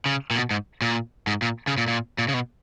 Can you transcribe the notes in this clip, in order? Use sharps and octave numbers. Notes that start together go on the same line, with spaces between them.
C#3
A#2
B2
G#2
A#2
G#2
A#2
C#3
A#2
A#2
A#2
C#3
B2